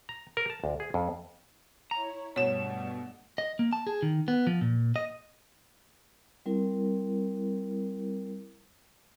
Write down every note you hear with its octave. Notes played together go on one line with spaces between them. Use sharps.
A#5
A#4
A5
D2
G#4
F2
E4 C#5 A#5
G2 B2 G3 A3 C#5 E7
D#5
A#3
A5
G#4
D#3
B3
F3
A#2
D#5
G3 C4 E4 A#4